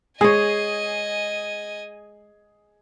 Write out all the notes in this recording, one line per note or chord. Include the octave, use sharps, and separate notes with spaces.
G#3 G#4 C#5 D#5 G#5